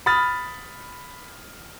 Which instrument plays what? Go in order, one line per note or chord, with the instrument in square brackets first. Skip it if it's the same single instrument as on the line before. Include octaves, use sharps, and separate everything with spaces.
[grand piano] B5 D#6 F6 A6